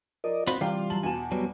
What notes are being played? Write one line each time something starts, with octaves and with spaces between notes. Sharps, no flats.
F3 A#4 D5 D#5
C4 F4 F#4 C5 B5
C3 E3 G3 F4 D5 F5 G5
F#3 A5 F#7
E2 B2 G#5 A5
F#3 G3 B3